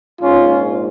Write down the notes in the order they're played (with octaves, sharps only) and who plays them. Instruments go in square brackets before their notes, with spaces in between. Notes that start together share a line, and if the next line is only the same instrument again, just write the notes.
[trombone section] A#1 G#2 C#4 F4